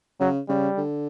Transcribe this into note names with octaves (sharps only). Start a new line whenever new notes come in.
C#3 F#3
C#3 G3
D3